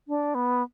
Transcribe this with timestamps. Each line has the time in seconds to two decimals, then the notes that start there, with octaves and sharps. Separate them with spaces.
0.08 D4
0.35 B3